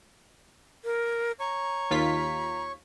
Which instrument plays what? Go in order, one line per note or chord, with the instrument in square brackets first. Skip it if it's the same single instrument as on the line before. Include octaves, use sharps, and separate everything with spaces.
[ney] A#4
[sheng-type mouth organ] C#5 C#6 [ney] A#5
[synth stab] D#2 F4 B6